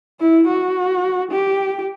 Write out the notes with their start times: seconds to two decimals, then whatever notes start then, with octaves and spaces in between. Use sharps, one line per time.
0.19 E4
0.48 F#4
1.31 G4